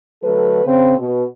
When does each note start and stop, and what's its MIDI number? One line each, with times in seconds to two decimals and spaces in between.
0.23 0.64 50
0.23 0.64 54
0.23 0.64 57
0.23 0.64 69
0.23 0.64 71
0.64 0.95 49
0.64 0.95 60
0.98 1.23 47